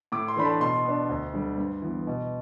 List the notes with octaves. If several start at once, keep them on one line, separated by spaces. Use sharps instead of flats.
A2 D6
C6
E3 A3 D4 B5
A5
B2 C6
B3 D4
D2
D3 G3
G2
E3 B3
B2